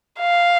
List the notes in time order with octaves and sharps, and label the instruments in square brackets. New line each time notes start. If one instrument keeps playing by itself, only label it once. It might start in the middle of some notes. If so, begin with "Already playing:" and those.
[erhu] F5